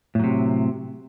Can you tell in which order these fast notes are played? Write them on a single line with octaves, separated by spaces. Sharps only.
A2 F#3 C3